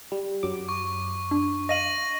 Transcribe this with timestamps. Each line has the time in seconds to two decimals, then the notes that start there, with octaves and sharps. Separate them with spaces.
0.12 G3
0.43 F#2 F#3 D6
0.69 C#6
1.31 D4
1.69 D#5 F5 A#6 D#7 F#7